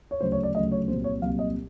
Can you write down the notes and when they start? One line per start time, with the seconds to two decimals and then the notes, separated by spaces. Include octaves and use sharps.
0.11 C#5
0.21 D2 C#3 F#3 C5
0.32 C#5
0.43 D5
0.55 D2 C#3 F#3 D#5
0.72 C#5
0.88 C2 A#2 F#3 C5
1.04 C#5
1.22 C2 A#2 F#3 F5
1.39 D#5